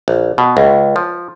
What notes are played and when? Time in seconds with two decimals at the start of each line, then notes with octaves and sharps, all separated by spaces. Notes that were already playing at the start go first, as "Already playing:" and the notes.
0.08 A#1
0.38 B2
0.57 C#2
0.96 F3